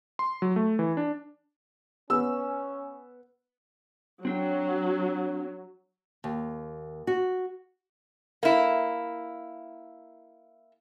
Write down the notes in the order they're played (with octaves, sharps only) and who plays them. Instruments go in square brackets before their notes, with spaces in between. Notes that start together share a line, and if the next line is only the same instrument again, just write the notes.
[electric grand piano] C6
F#3
A3
E3
D4
[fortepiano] B3 [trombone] C#4 [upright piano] E6
[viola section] F#3 [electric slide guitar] C4 D4 G5
[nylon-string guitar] D#2
F#4
[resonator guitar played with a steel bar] A#3 E4